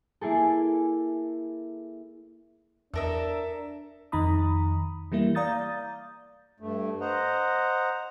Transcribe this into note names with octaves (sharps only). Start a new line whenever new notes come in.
A#3 E4 G#4 A4
E2 D4 A4 A#4 D#5 E5
F2 D#3 D#4 A#5 B5 D#6
E3 G3 A#3 E4
D5 F5 A#5 D#6 G6 A6
G2 A3
C5 D#5 F#5 A#5